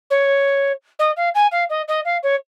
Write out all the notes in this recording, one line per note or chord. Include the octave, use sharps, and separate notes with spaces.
C#5
D#5
F5
G#5
F5
D#5
D#5
F5
C#5